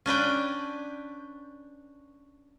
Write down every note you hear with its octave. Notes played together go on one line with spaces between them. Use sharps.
C#4 D4 B4 G5